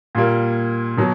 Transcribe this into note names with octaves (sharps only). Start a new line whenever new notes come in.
A#2 G3 A#3
B2 F#3